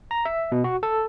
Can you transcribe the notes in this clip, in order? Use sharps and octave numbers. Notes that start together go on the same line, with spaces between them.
A#5
E5
B2
F#4
A4